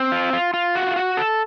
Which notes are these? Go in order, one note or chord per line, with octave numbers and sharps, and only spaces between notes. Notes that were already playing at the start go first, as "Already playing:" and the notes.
Already playing: C4
F4
F4
F4
F#4
F#4
A4